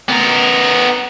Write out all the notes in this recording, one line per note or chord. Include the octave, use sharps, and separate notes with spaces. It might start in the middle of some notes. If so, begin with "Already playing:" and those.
B3 A#4